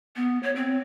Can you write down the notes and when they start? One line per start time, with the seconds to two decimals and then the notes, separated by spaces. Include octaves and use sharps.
0.16 B3
0.43 C#5
0.56 C4